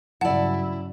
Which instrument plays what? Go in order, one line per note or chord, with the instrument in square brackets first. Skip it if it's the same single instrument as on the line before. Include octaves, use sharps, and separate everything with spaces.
[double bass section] G2 C#3 F#3 [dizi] E4 [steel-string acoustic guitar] D5 A5 [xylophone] F#5